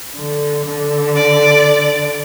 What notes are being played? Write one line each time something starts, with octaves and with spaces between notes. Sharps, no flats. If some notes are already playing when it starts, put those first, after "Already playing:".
D3
D3
D5